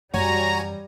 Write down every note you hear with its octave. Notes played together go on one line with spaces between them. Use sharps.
F#2 E3 G3 F#4 C#5 G#5 A#5